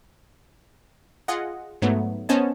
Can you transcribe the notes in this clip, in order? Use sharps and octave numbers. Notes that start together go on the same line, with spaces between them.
F4 G#4 D#5 F#5
G#2 F#3 A3 B3
B3 C#4 C5 C#5 D#5 A5